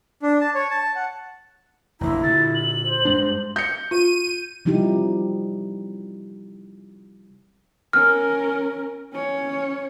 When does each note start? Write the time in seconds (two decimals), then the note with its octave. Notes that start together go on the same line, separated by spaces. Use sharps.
0.23 D4
0.41 A5
0.55 C#5
0.71 A5
0.96 F#5
2.01 F1 A#1 E4 A#5
2.23 A#2 D3 A6
2.55 F#7
2.84 C5
3.05 G2 G#3 D4
3.56 G6 C#7
3.91 F4 D#7
4.65 C3 F3 G3 D#4 E4 G4
7.93 C#4 A#4 F6
9.12 C#4 C#5